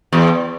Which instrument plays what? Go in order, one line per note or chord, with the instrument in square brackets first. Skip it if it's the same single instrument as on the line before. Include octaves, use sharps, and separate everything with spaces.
[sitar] E2